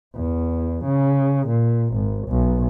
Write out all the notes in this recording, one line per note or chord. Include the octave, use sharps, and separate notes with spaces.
E2
C#3
A#2
G#1
B1